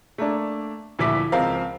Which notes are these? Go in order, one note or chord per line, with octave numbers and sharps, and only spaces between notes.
A3 A#3 D4
D2 A#2 F3 E4 D6 B6
C#2 F3 C4 A#4 F5